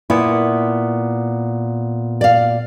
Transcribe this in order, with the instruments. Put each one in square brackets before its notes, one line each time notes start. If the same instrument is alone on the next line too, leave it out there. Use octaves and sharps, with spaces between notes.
[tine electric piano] A#2 B3 [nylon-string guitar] E4
[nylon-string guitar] D5 F5